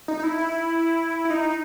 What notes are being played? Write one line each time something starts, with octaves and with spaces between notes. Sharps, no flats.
D#4
D#4
E4
E4
E4
D#4